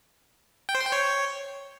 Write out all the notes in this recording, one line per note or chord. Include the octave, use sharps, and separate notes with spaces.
G5
C5
C6
G5
C#5